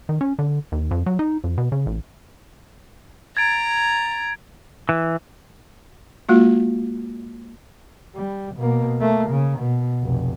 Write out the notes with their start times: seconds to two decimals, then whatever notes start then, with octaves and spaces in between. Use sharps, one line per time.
0.09 D#3
0.21 C#4
0.39 D3
0.72 D#2
0.91 F2
1.06 F#3
1.19 D#4
1.44 F2
1.58 B2
1.72 C#3
1.86 A1
3.37 A#5 G#6 A6 D7
4.89 E3
6.29 G#3 A#3 F4 F#4
8.15 G3
8.56 B2 A#3
8.99 A3 A#3
9.30 C#3
9.59 B2
10.02 F1 B1